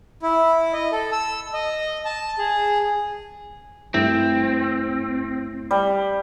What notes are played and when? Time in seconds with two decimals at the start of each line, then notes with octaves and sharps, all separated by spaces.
0.22 E4
0.73 D#5
0.92 A4
1.12 E6
1.53 D#5
2.05 A5
2.38 G#4
3.94 G2 A3 C4 E4
5.71 G3